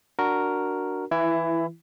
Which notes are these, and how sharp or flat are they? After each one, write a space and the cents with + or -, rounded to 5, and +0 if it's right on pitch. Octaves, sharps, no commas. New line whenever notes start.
D4 +0 F#4 +0 A#4 +0
E3 +0 E4 +20